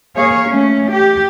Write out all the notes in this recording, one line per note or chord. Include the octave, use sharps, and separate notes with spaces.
A#3 G#4 C#5 F5
A3 C#4
G4